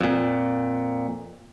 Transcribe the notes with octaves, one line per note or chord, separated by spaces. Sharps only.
F2 A#2